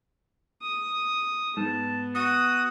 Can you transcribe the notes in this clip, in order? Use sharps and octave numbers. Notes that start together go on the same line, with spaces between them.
D#6
G#2 B3 A5
F#4 D#6